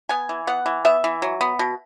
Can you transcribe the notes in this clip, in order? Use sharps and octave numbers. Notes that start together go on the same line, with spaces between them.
B3 G#5
E3
B3 F#5
E3
B3 E5
E3
F#3
B3
B2